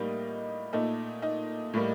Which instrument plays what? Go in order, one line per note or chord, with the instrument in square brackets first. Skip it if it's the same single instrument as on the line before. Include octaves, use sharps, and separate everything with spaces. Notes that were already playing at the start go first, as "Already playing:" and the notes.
Already playing: [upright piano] A2 G3 A#3 D#4
A#2 A3 D#4
D#4
A2 G3 A#3